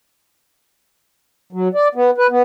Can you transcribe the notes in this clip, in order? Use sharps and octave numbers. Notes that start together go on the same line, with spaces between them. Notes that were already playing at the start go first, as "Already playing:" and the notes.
F#3
D5
B3
B4
B3